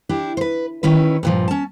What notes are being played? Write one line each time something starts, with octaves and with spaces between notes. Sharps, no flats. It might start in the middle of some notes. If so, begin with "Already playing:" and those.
D4 E4 G4
B4 C5
D#3 C#4 E4 B4
G2 A#2 F3
C#4 A5